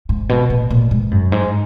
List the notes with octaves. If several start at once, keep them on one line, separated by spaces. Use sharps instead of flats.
G#2
B2
A#2
A#2
G#2
F#2
G#2